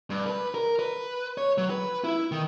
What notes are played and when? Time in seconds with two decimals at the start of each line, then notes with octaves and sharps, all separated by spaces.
0.10 G2
0.26 B4
0.54 A#4
0.79 B4
1.38 C#5
1.58 F#3
1.70 B4
2.04 E4
2.32 D#3